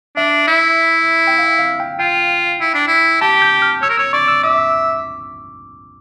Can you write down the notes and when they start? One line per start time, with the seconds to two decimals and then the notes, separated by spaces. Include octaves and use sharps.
0.16 D4 E5
0.47 E4
1.27 G5
1.39 F5
1.59 F5
1.80 G5
1.99 F4 G5
2.61 E4
2.74 D4
2.88 E4
3.21 G4 A5
3.42 G6
3.62 F6
3.82 C#5 E6
3.90 A#4
3.97 C#5 E6
4.13 D5 C#6
4.28 E6
4.43 E5 D6